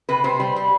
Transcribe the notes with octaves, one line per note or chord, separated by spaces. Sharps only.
C3 B4
C3 C5
G3
G3